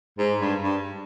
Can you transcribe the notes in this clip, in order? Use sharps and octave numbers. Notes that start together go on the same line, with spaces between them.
G#2
G2
G2